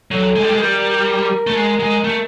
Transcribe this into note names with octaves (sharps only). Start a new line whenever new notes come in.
F#3 A4
G#3
G3
G#3
G3 A#4
A3
G#3
G#3
A3